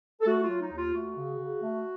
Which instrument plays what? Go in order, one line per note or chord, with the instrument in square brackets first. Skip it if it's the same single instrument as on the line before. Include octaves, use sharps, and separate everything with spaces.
[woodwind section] A4
A3 F#4
F4
F#3
D#4
D#2 F4
A3 F#4
C#3
C#3
A3